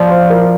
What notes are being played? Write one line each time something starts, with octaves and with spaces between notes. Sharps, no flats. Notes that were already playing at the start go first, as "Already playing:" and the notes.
Already playing: F3 D5
C5
A#4